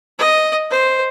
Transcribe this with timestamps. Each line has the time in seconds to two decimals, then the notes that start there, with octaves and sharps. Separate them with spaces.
0.19 D#5
0.71 C5